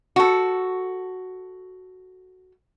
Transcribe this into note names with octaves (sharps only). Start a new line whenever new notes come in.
F#4 A4